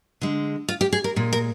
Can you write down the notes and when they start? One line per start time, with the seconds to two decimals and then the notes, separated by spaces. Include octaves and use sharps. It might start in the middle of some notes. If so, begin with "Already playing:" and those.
0.21 D3 G#3
0.68 F4
0.81 G4
0.93 G#4
1.04 A#4
1.16 A#2 G#3
1.33 A#4